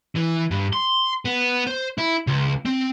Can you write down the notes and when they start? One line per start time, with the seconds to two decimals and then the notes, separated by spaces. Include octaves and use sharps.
0.15 E3
0.51 G2
0.73 C6
1.25 B3
1.67 C5
1.98 E4
2.27 C#2
2.65 C4